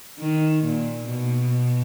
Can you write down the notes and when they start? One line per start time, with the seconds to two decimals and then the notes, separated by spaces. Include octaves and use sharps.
0.19 D#3
0.64 A#2
1.09 B2